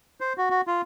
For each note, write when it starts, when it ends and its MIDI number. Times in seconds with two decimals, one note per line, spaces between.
0.20 0.33 72
0.38 0.49 66
0.50 0.61 66
0.67 0.82 65